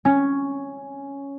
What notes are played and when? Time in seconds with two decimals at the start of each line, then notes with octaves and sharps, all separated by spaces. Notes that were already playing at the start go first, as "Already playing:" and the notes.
0.05 C#4